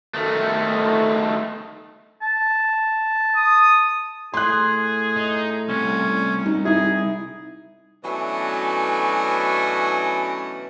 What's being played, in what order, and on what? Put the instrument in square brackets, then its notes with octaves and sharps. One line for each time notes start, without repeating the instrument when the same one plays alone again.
[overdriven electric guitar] D#3 A3
[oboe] A5
[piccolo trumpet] D#6
[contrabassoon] A2 [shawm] G#4 [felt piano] C6 F#6
[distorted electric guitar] D#4
[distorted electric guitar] C2 [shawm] C#4
[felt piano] D#4
[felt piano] D#4 E4 [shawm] G#4
[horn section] B2 E3 F#3 A3 C#4 D4